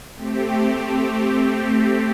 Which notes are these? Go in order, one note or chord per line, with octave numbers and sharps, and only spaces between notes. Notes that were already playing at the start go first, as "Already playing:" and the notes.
A3 C4 G4